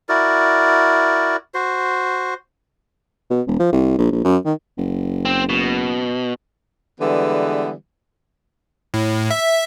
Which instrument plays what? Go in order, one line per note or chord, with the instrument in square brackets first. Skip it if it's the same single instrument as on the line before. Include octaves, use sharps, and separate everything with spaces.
[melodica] E4 F#4 A#4 D5
F#4 C5
[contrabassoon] B2
E1
F3
C2
A#1
A#1
F#2
D#3
F#1
[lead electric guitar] C4
B2
[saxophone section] D3 E3 G3 G#3 B3
[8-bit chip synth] A2
E5